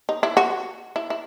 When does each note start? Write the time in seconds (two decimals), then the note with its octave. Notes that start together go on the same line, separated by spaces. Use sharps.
0.09 D#4
0.23 E4
0.37 F#4
0.96 E4
1.10 E4